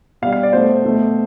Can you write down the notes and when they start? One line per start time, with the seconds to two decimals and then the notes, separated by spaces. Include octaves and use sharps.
0.22 B2 G3 F5
0.33 F5
0.43 D5
0.53 B2 A3 C5
0.85 B2 A3